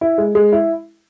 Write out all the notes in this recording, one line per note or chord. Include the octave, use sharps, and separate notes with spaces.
E4
G#3
G#3
E4